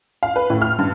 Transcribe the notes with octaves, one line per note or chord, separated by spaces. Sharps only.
F5
B4
A2
F6
G2